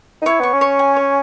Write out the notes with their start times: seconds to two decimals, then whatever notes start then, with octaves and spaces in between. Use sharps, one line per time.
0.21 D#4
0.26 E4 C#5
0.40 B3 C#6
0.53 C#4
0.61 C#5
0.79 G#5
0.97 C#5